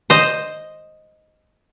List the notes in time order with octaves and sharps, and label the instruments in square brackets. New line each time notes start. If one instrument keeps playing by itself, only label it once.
[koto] C5 D#5